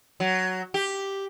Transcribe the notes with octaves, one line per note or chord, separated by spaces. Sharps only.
F#3
G4